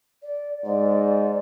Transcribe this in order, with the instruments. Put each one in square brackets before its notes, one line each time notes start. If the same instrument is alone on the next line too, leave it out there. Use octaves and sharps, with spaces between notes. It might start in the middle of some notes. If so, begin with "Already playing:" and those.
[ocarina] D5
[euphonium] G#2 [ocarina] D5